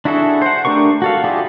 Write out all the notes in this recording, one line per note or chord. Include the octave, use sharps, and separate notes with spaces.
D4 E4 F#4 G#4 A4
C5 F#5
A3 D4 G4 A#4 C#6
F#4 A4 F5
E4 F4 G4 G#4 D5